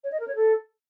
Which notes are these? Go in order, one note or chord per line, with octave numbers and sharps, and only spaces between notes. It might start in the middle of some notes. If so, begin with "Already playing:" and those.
C#5
D#5
A#4
C#5
A4